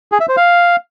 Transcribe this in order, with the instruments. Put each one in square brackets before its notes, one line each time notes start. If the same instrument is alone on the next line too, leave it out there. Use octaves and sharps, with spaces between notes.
[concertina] G#4
E5
C5
F5